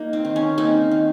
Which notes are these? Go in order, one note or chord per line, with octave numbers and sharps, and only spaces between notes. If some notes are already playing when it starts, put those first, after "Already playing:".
Already playing: A#3 D#4
C4
D#3
C#4
A#3 C4 D#4
D#3